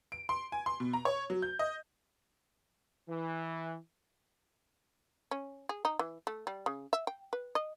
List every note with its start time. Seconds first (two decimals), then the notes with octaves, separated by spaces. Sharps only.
0.12 D7
0.29 C6
0.52 G#5
0.66 C6
0.80 B2
0.93 A#5
1.05 C#5
1.30 F#3
1.42 G6
1.59 D#5
3.09 E3
5.31 C#4
5.69 G#4
5.85 D#4
5.99 E3
6.27 A3
6.47 G3
6.66 C#3
6.93 E5
7.07 G5
7.33 B4
7.55 D#5